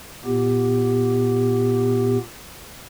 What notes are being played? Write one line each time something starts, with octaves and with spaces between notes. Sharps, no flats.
A#2 B3 G4